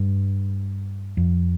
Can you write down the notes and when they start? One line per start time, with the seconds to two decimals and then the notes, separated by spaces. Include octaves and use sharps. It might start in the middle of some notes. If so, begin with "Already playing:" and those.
Already playing: G2
1.17 F2